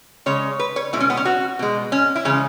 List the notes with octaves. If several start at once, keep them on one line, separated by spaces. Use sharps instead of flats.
C#3 G#3 C#5
B4
C#5
B2 G#3 E4
C#4
B3
C#4
F#4
B2 G#3
C#4
E4
C#3 E3 G#3 C#4